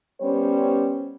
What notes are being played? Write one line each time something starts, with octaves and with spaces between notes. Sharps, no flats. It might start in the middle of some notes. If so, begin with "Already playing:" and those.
G3 B3 C#4 C5 C#5